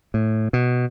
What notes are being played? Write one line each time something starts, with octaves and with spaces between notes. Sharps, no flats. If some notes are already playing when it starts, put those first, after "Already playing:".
A2
B2